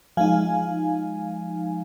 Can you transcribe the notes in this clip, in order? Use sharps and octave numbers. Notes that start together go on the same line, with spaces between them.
F3 G#3 D#4 F5 G#5